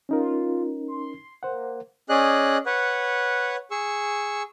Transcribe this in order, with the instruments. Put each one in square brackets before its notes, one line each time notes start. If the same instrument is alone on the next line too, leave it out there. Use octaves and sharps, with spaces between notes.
[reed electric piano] C#4 D#4 A#4 [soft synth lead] F4
[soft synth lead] C6
[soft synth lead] A#3 [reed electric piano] C5 F#5
[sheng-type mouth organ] C#4 G#4 D5 D#5 F#6
B4 C#5 F#5
G#4 C#6 E6